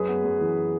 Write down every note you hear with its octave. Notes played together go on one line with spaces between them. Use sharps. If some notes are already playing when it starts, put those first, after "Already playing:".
Already playing: F#2 G#4 B4
B3
F#2
E3